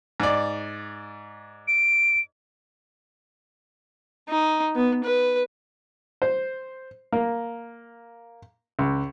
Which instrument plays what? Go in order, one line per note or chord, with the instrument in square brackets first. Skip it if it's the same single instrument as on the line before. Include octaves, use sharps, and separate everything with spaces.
[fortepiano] G#2 D5
[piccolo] D7
[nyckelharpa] D#4
B3
B4
[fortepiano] C5
A#3
C#2